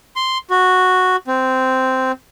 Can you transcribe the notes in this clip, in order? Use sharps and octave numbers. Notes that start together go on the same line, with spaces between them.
C6
F#4
C4